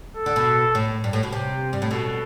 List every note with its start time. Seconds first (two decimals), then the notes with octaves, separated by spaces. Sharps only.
0.17 A4
0.26 D3
0.36 B2
0.75 A2
1.04 G2
1.13 A2
1.23 B2
1.32 C3 G4
1.73 G2
1.82 A2
1.91 B2 A4